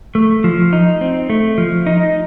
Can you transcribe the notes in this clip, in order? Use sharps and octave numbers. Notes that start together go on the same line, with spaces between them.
A3
F3
D#4
C4
A3
F3
D#4